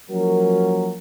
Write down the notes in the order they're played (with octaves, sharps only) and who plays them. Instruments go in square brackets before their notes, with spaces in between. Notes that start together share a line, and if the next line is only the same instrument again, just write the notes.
[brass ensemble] F3 F#3 A#3 C#4 F#4 A#4